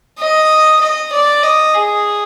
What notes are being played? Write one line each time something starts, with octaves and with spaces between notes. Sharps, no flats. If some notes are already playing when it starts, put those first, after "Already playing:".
D#5
D#5
D5
D#5
G#4